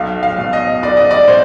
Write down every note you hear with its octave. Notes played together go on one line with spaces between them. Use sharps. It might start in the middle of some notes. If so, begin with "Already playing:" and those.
Already playing: B1 F5
F5
B2
D#5
B1 D5
D#5
D5
B2 C5